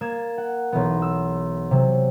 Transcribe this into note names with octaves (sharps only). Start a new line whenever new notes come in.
A#3 G#6 A6 E7
F#5
B1 E3 B3
E6
C3 F#3